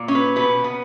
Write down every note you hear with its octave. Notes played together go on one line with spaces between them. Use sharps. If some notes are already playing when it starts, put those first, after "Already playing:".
Already playing: A#2
C#4
B4
B2 B4
B3